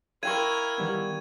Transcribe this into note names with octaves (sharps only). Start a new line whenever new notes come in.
E4 A#4 F5 G5 C#6 G#6 D#7
D#3 G3 B3